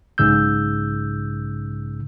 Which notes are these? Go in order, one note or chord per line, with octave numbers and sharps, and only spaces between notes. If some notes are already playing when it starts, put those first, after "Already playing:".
B1 G#2 C#3 E6 G6